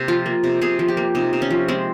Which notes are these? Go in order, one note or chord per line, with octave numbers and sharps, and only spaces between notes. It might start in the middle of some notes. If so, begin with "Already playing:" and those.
Already playing: C3 A#3
F3 F4
A#3
C3
C3 G#4
F3
G4
A#3
C3 D#4
C3
C#4
F3
G#3 C4